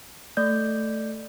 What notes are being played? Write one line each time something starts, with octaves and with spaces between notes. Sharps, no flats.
A3 D5 G6